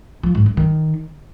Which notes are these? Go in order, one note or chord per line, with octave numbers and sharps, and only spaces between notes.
F3
G#2
G2
D#3